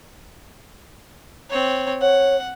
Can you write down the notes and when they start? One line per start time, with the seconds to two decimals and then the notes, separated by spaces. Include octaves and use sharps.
1.50 C4 C#5
2.01 C#5 F#5